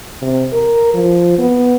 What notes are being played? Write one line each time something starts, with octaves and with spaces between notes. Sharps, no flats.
C3
A#4
F3
B3